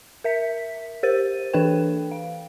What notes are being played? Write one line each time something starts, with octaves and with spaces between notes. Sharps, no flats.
A#4 E5 B6
G4 A#4 C5 A6 D#7
E3 D4 A4 B4 G5
F5